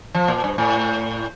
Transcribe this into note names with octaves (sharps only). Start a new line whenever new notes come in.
F3
A#2
G2
A2